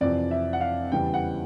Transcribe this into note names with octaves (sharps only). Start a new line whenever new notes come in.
F2 C3 E3 D5
E5
F#5
F5
E2 C#3 E3 G3 G5
F#5